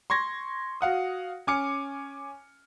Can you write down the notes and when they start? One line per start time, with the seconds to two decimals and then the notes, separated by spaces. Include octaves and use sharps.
0.10 C6 C#6 G#6 A#6
0.81 F#4 F5 F#5 D#6
1.47 C#4 G#5 D6 F6 C#7